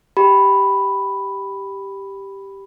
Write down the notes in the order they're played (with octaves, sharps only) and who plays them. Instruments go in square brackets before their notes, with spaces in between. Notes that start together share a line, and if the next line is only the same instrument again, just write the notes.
[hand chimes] G4 B5